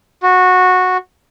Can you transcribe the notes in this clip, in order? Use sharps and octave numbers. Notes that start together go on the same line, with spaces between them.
F#4